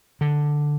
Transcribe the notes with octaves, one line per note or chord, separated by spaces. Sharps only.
D3